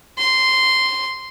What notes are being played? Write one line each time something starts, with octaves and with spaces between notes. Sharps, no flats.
C6